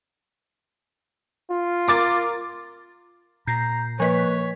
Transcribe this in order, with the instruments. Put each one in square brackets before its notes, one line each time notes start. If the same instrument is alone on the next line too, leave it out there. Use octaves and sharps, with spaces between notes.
[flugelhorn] F4
[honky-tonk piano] A#4 D6 A6
[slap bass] A#2 [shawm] A#5 [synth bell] G6 C7
[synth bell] F3 A#3 B6 [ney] B4 [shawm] C#5